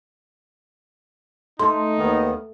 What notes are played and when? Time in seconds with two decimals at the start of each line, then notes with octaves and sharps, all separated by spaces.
1.59 A3 D#4 C6
1.98 D#2 D#3 B3